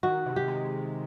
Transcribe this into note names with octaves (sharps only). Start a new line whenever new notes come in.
D#3 F#4
C3
G4
G#3